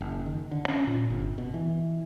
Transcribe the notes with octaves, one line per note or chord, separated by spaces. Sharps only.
F#1
D#3
D3
C#4
A#2
G1
B2
E3